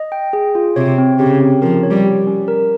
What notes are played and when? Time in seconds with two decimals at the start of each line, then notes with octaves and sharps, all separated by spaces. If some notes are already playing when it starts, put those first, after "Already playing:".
Already playing: D#5
0.12 G5
0.33 G#4
0.55 F4
0.76 C3 C#5
0.98 C4
1.19 C#3 G4
1.40 C4
1.62 F3 A#4
1.83 C#5
1.91 G3
2.04 G4
2.27 C#4
2.48 A#4